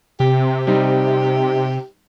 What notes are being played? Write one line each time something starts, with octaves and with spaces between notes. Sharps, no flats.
C3 G4
G3 C4 D#4